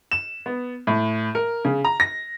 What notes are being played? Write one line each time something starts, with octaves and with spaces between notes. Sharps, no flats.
E7
B3
A2
A#4
C#3
A#5
A#6